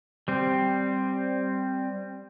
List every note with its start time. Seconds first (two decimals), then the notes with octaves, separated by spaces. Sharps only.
0.28 G3 C4